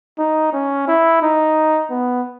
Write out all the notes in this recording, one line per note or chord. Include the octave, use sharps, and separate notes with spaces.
D#4
C#4
E4
D#4
B3